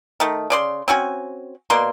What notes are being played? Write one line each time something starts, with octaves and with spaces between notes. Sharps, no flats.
D#3 A3
C#3 D5 C6
C4 C#4 F#4 G#5
B2 A#3 D5 C6